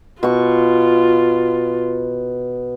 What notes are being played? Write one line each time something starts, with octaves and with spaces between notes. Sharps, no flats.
B2 F4 C#6